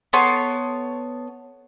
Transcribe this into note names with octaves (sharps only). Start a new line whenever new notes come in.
B3 A4 C#5 C6